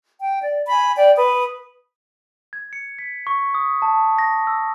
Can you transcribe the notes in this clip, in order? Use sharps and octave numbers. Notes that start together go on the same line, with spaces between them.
G5
D5
G#5 B5
D5 G5
B4 D#6
G#6
C#7
B6
C#6
D#6
A5
A#6
E6